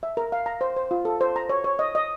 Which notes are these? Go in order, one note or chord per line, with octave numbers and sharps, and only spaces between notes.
E5
A#4
F5
A#5
C5
C5
F4
A4
C5
A#5
C#5
C#5
D#5
D#5